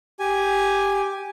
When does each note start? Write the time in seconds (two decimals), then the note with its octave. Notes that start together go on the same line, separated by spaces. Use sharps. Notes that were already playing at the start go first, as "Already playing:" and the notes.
0.19 G4 G#5